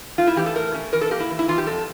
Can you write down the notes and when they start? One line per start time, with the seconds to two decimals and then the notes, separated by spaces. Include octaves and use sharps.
0.18 A3 F4
0.27 E4
0.36 E3 G4
0.46 A4
0.56 A3 A#4
0.74 C#4
0.92 E3 A#4
1.01 A4
1.11 A#3 G4
1.20 E4
1.30 E3
1.39 E4
1.48 E3 F4
1.58 G4
1.66 F2 A4